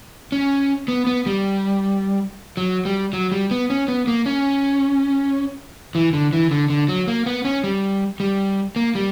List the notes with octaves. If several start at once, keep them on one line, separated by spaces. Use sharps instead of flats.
C#4
B3
B3
G3
F#3
G3
F#3
G3
B3
C#4
B3
A#3
C#4
E3
D3
E3
D3
D3
F#3
A#3
B3
C#4
G3
G3
A#3
G3